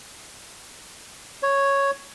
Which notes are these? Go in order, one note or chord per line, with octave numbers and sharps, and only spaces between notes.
C#5